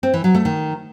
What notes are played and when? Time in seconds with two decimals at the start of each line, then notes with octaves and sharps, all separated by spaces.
0.03 C4
0.14 E3
0.24 F#3
0.35 A3
0.45 D#3